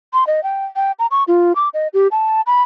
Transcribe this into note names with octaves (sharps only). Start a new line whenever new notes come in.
C6
D#5
G5
G5
A#5
C#6
F4
D6
D#5
G4
A5
B5